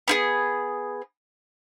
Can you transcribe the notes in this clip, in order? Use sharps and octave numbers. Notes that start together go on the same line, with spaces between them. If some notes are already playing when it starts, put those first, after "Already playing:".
B3 E4 G#4